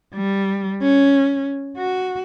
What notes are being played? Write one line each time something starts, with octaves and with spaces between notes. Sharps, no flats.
G3
C#4
F#4